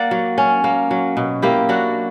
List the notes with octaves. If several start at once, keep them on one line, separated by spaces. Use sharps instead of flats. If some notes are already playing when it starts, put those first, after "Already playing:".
Already playing: A#3 D5 F#5
F#3
C#4
A#3
F#3
B2
A#3 E4 G4
F#3 D4 F#4